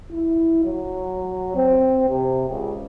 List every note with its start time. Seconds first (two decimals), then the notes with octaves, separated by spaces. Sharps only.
0.12 E4
0.64 F#3
1.55 C4
2.09 C3
2.50 C#2